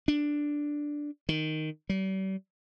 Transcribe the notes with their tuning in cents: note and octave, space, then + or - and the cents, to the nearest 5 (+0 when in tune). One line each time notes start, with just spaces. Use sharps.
D4 +0
D#3 +0
G3 -40